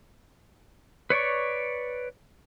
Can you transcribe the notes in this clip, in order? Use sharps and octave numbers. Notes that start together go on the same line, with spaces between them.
B4 C#5 D5 C#6